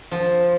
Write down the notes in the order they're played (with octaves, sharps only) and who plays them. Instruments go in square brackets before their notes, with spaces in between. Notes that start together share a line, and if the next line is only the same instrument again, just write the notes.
[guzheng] F3